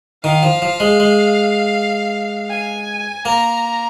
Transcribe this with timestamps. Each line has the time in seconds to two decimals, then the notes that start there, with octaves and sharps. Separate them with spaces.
0.24 D#3 F5
0.43 F3
0.62 F3
0.80 G#3
1.00 G#3
2.50 G#5
3.25 A#3 A#5